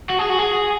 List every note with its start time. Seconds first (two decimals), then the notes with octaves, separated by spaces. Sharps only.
0.10 F#4
0.19 G#4
0.30 F#4
0.39 G#4